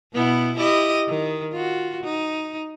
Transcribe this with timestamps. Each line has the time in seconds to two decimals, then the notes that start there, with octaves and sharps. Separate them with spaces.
0.14 B2 B3 E4
0.57 E4 G4 D#5
1.08 D#3
1.52 F4 F#4
2.03 D#4